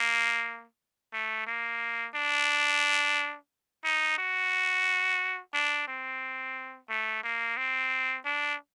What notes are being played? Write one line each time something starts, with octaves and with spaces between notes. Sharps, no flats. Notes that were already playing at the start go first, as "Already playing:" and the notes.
Already playing: A#3
A3
A#3
D4
D#4
F#4
D4
C4
A3
A#3
C4
D4